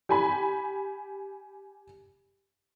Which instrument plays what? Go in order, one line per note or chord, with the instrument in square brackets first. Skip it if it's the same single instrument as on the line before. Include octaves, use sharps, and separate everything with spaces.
[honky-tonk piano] G4 G#5 B5